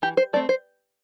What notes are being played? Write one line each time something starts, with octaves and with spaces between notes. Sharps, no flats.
E3 G4
C5
A3 C4 D5
C5